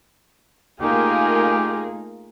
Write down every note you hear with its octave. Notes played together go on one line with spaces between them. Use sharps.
A3 A#3 D#4 F4 G4 G#4